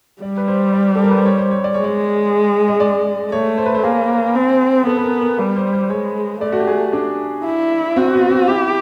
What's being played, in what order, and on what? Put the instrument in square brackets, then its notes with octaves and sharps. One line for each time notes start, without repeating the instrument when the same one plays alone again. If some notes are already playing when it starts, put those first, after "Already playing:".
[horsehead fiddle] G3 [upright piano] D5
[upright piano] B4
C5
D5
A4
A#4
B4
C5
C#5
C5
C#5
D5
[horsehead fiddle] G#3 [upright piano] C#5
[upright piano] D5
D#5
D5
[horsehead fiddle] A3 [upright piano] C#5
[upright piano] C5
B4
C5
[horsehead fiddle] A#3 [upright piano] G#4
[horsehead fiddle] C4
[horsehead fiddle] B3 [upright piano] A4
[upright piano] B4
A#4
A#4
[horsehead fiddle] G3 [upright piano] B4
[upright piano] C5
C5
[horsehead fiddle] G#3 [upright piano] C#5
[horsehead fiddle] A3 [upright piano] D5
[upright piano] F#4
G4
G#4
D4
[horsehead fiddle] E4
[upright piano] C4 [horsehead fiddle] F#4
[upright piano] B3
C4
[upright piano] E4 [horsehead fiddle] G4